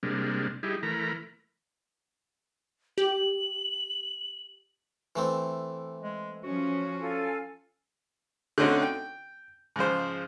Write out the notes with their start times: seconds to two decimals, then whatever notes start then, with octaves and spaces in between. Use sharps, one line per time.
0.03 C3 G3 G#3 A#3 D4
0.63 G3 D#4 E4 G4 G#4
0.83 E3 A3 A#4 A#5 B5
2.98 G4 F#7
5.16 E3 A3 C4
6.01 G#3
6.44 F3 C#4 F#4
7.00 F4 A4 G#5
8.58 D3 A3 C4 C#4 D#4 F#4
8.82 G5
9.76 G#2 C#3 F3 C5